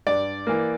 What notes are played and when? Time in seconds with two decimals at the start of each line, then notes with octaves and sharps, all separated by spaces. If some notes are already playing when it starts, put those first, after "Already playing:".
0.07 G2 D5
0.47 E3 A#3